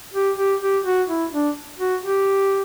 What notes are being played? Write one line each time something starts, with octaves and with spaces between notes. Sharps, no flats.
G4
G4
G4
F#4
E4
D4
F#4
G4